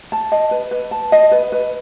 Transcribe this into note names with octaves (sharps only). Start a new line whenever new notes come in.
A5
D#5
B4
B4
A5
D#5
B4
B4